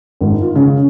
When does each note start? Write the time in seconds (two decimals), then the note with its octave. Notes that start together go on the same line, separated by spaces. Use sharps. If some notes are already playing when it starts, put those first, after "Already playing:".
0.21 G#1
0.41 F4
0.55 C#3